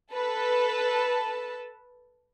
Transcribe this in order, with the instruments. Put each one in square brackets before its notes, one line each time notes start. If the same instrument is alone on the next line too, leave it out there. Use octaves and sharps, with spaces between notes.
[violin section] A4 B4 A5